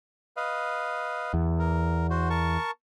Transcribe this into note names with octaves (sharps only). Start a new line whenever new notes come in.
B4 D#5 F5
E2
A#4
F#4 C5
A#4 A5 C#6